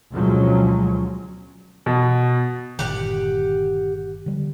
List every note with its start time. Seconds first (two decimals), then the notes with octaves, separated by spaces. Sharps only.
0.12 D2 B2 F3 F#3 G#3 C#4
1.86 B2
2.79 G1 A#2 D#3 G4 F#5
4.26 D3 G3